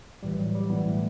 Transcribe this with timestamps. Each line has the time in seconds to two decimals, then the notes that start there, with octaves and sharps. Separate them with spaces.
0.23 A1 A2 E3 G3
0.38 F#3
0.55 G3
0.70 A1 A2 E3 B3
0.87 A3